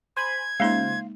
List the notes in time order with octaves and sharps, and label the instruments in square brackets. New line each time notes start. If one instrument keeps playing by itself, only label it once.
[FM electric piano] C5 G#5 B5 [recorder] G#6
[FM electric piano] C#3 F4 C5 [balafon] G#3 A#3 D#4 [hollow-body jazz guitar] F5